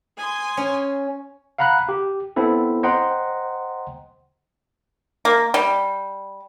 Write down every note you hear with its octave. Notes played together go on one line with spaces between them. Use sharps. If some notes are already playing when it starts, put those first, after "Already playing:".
G#5 C6 D#6
C#4
F5 F#5 A#5 B5 F#6
G4
B3 C4 E4 A4
C5 D#5 F#5 G5 A#5 C6
A#3
G3